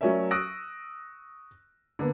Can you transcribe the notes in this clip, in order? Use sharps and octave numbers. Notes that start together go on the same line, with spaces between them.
F#3 A3 C#4 A#4 D5 E5
C#6 D#6 E6 F#6 A#6 D7
D3 A#3 B3